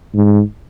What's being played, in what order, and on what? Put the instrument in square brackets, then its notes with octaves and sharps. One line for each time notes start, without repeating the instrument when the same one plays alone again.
[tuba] G#2